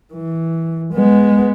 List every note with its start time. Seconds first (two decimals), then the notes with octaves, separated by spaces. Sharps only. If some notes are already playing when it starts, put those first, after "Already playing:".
0.14 E3
0.94 G#3 B3